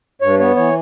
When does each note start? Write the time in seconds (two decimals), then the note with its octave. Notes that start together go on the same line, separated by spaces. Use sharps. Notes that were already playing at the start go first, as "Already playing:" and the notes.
0.21 G2 C#5
0.39 B3 C#5
0.56 E3 C#5